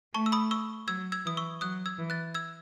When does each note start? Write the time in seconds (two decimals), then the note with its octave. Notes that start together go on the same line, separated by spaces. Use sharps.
0.14 A3 A5 C#6
0.26 E6
0.32 B5 D#6
0.51 C#6 E6
0.87 F#3 E6 G#6
1.12 E6 G#6
1.25 E3 D#6
1.37 C#6 E6
1.61 F#3 D#6 F#6
1.86 E6 G#6
1.98 E3
2.10 F#6 A6
2.34 E6 G#6